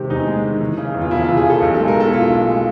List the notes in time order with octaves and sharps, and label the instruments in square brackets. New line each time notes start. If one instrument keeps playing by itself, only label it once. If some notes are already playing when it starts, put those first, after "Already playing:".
Already playing: [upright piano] C3 D#3 G#3 G4
E2 D#4
G#3
D#3
E3
C#3
E2
F4
E1 E4
E3 F4
G#4
C#3 A4
B1 G4
G#3 A4
A#4
B2 A4
E4
B1 F4
B1
G#3